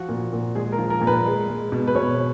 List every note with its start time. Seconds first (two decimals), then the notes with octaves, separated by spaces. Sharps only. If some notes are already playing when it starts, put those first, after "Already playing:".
Already playing: F3 F#4
0.09 A#2
0.33 A#2
0.55 G#3 G#4
0.72 A#4
0.78 F3
0.90 A#4
1.01 A#2
1.07 B4
1.26 G#3
1.49 G#3
1.72 B2
1.87 B4
1.95 B2 C#5